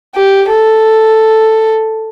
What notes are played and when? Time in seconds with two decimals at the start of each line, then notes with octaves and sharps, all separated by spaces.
0.15 G4
0.50 A4